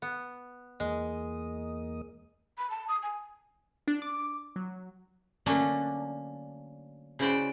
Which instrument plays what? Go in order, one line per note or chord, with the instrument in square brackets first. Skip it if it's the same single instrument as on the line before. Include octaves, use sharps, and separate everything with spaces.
[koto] B3
[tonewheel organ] E2 A#3 D#5 [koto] G#3
[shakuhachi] B5
A5
D#6
G#5
[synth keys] D4
D6
F#3
[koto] D3 F#3 A3 A#3 C#4 D4
C#3 E4 F#4 C5 D5 G5